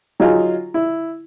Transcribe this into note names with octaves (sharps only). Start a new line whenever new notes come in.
F#3 D#4 F4 G#4
E4